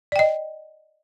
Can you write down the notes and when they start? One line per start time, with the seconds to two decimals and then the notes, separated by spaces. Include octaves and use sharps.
0.12 D5
0.16 G5
0.19 D#5